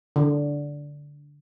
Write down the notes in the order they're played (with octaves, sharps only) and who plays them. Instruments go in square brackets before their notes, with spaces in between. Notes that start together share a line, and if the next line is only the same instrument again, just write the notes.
[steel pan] D3